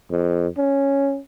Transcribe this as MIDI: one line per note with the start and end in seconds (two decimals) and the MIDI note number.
0.11 0.47 41
0.58 1.19 61